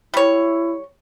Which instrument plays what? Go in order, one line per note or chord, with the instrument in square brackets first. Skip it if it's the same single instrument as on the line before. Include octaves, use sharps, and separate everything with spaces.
[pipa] G3 C#5 [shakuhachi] E4